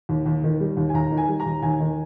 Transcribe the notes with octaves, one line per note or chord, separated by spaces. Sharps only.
D#2
D#2
D#3
G3
D#2
G#5
D#2 A#5
D#3
G#5
G3
A#5
D#2
D#2 G#5
D#3